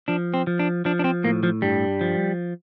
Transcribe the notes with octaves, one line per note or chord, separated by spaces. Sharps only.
F3 D4
C4
F3
D4
F3 D4
D4
C4
A2 A#3
F3
G2 G3
F3